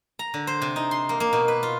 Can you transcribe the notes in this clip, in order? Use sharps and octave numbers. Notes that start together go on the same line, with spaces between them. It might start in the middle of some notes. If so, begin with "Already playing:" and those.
A#5
D3
C5
C3
D#4
C6
A#3
A#3
B2
B4
F4